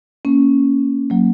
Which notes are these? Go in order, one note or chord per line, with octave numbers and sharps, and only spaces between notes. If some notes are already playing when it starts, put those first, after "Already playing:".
A#3 C#4
F#3 A#3